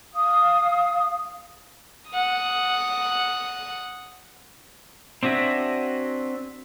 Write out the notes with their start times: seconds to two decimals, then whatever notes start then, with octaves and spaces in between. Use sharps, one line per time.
0.15 F5 D#6
2.10 F#5 D#6
5.23 C4 D4 F#4 E5 G#5